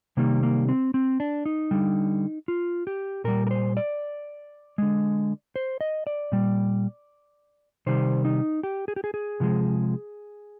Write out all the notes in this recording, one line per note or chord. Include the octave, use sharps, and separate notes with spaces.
C3 D#3 G3 A#3
A#3
C4
C4
D4
D#4
D3 G3
F4
G4
A#2 G3 A#4
A#4
C5
D5
D3 G#3
C5
D#5
D5
A#2 G3
C3 D#3 G3 C5
D#4
G4
G#4
G4
G#4
G#4
C3 F3 G#3